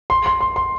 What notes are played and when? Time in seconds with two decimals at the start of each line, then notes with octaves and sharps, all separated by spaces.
0.10 C6
0.26 C6
0.41 C6
0.56 C6